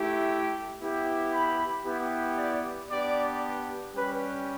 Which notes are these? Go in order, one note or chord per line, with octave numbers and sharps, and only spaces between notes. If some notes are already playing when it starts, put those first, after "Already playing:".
Already playing: A3 E4 G4
B3 E4 G4
B5
B3 E4 G4
D5
B3 D4 G4 D5
G3 C#4 G4 B4